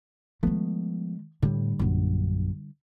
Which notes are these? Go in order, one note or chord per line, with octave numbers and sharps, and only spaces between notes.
D#3 F3 G#3 A3 B3
A2 D3 G3
A#1 F#2